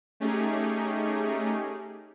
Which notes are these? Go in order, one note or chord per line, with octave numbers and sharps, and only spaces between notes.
A3 C#4 D#4 G4 G#4